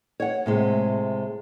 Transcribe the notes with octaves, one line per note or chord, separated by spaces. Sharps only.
C#5 F#5
A2 C3 G#3